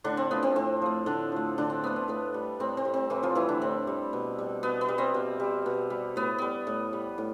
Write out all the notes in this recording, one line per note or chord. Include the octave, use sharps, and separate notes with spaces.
A2 D3 D4
C4
F3 A3 B3
C4
A2 C4
F3 A3
A2 D3 D4
F3 A3
A2 D3 D4
C4
F3 A3 B3
C4
A2 B3
G3
A2 C4
C4
G3
C4
A2 E3 E4
F3 F4
E3 G3 E4
D3 D4
A2 C4
G3
B2
G3
B2 B3
B3
G3
C4
B2
G3
B2
G3
A2 B3
G3 B3
A2
G3
A2